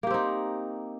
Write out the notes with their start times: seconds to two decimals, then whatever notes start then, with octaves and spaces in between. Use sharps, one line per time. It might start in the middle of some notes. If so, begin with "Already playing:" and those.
0.03 A#3
0.07 G4
0.10 C4
0.14 D#4